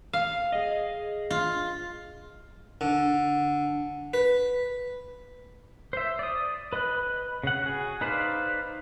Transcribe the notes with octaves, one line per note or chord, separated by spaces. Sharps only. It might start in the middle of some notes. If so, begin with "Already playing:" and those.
F5
G#4 D#5
F4
D3
B4
C5 E5
D5 D#6
B4 D#5 B5 F#6
C#3 F#5
F#4 G#4
D#4 B4 C5 D5 F5